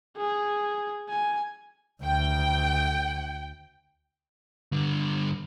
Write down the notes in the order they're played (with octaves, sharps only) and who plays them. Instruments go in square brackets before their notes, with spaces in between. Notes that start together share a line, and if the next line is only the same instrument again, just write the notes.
[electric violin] G#4
G#5
[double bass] D2 [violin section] G5
[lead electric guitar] G2 D3